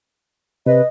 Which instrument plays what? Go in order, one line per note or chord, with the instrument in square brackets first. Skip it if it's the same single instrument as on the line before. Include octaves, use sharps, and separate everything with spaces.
[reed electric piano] C3 [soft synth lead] B4 [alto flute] D#5